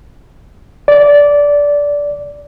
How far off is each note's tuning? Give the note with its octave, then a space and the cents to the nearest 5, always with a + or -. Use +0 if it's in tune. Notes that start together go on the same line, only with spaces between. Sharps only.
D5 -15